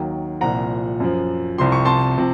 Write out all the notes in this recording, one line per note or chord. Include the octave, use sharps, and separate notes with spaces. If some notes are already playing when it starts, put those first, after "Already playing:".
Already playing: D#2 D#3 F#3
C2 A#2 F3 F#5 A#5
F#2 F3
C2 C3 F3 C6
C#6
A5 C6
C3 F3